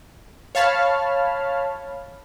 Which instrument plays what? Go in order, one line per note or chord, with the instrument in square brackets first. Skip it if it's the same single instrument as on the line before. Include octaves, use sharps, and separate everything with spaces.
[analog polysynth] C#5 F5 A5 B5 F6